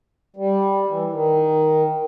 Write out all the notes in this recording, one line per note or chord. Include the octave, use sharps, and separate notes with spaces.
G3
E3
D#3